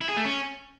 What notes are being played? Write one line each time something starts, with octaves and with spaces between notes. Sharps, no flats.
E4
G#4
A3
C#4